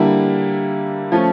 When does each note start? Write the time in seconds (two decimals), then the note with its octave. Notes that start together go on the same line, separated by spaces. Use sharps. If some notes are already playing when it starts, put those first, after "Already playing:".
Already playing: D3 G3 A#3 E4
1.12 F3 A3 C#4